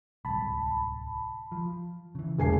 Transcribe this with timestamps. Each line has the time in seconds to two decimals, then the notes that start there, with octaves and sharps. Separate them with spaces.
0.25 D1 C2 A5 B5
1.52 F3
2.15 C#3 E3
2.39 E1 A1 A2 C#3 G#5 C7